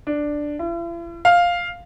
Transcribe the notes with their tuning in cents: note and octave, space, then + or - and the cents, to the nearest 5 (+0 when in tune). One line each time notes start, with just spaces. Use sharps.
D4 +5
E4 +45
F5 +5